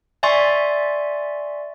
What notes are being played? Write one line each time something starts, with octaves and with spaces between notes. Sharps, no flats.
D5 E5 G#5 C6 C#6 A6